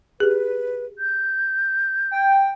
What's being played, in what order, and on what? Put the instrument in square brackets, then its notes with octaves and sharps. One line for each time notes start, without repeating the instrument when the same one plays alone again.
[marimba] G4 G#4 [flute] B4
[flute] G6
[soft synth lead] G5